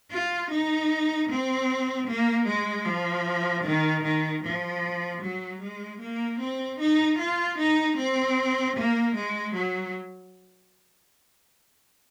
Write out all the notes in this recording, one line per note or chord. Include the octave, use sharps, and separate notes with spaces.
F4
D#4
C4
A#3
G#3
F3
D#3
D#3
F3
F#3
G#3
A#3
C4
D#4
F4
D#4
C4
A#3
G#3
F#3